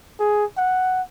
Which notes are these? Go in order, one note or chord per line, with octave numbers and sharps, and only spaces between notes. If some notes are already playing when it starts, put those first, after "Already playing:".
G#4
F#5